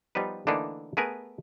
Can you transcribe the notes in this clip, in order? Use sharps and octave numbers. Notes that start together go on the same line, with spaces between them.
F3 G3 B3 D#4 B4
D3 E3 A3 A#3 D4 D#4
A3 B3 G#4 A#4 B4 G#5